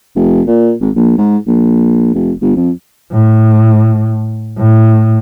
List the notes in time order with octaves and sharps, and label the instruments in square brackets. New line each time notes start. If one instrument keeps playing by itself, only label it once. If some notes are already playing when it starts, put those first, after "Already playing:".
[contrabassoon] F1
A#2
G#1
A#1
G#2
A#1
F1
G1
F2
[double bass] A2
A2